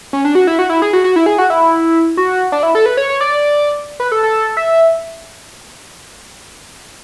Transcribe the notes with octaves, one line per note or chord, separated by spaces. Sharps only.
C#4
D4
F#4
E4
F#4
E4
G#4
F#4
F#4
E4
G#4
F#4
E4
F#4
D4
E4
A4
B4
C#5
C#5
D5
B4
A4
A4
E5